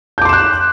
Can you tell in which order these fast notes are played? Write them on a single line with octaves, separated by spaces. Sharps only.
G6 D6 C6 E7 F#6